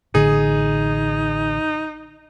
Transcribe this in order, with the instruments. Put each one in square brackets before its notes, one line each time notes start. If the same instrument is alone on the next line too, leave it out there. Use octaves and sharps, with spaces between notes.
[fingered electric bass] A1 D3 [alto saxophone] D#4 [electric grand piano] G#4